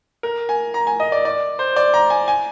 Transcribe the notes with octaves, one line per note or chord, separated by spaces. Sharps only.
A#4
G#5
A#5
G#5
D#5
D5
D5
C5
D5
A#5
G#5
G#5